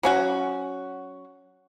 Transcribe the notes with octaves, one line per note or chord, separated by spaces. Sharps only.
F#3 C#4 F#4